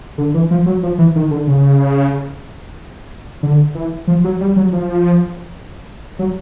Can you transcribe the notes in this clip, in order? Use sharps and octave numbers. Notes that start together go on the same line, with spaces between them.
D3
E3
F3
F#3
F3
E3
D#3
D3
C#3
D3
E3
F3
F#3
G3
F#3
F3
F#3